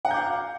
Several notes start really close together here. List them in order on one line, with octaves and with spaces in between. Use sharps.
F#5 A#5 G6 D6 F5